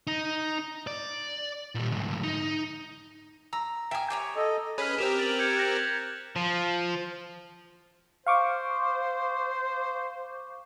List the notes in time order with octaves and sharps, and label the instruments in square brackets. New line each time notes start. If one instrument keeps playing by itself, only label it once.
[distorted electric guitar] D#4
D5
A#2 G3
D2 G#2
D#4
[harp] A#5 [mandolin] E6
[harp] E5 G#5 D#6 [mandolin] G5 F6
[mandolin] G4 C#5 A#5
[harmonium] A4 D#5
[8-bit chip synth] C#4 G#4 B4 [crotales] F6 B6 D#7
[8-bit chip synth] C4 G4 A#4 [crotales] E7 F7
[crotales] A6 F#7
G6 G#6 C#7
F#6 G6 A#6
[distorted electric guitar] F3
[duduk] C5 [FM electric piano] F5 C#6 D6